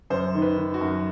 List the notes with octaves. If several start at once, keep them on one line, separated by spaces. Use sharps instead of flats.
F#2 C5
D#3
B4
D#3
F#4
F#2